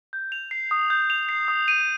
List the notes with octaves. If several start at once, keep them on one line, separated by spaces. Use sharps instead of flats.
G6
F7
C7
D#6
G6
F7
C7
D#6
D#7